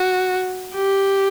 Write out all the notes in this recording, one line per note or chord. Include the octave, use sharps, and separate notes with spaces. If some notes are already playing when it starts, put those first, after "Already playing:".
Already playing: F#4
G4